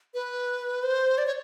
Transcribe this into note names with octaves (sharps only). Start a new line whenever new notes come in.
B4
C5
D5
C#5